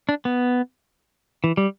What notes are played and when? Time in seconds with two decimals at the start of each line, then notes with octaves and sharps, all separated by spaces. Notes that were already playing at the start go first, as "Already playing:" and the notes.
0.09 D4
0.25 B3
1.44 E3
1.57 G3